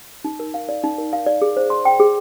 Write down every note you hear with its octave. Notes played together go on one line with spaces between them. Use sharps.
D#4
A#4
F5
D5
D#4
A#4
F5
D5
G#4
C5
C6
G5
G#4